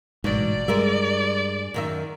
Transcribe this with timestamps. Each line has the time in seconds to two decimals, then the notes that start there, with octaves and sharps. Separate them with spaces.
0.24 A1 G#2 B2 F#3 D5
0.68 G2 G3 G#3 A#4 E5
1.74 F#2 D#3 E5